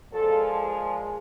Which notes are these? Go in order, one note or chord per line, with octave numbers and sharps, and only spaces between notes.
A#2 F3 G#3 A4
G#4